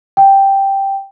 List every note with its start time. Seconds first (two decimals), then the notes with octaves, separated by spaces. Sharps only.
0.17 G5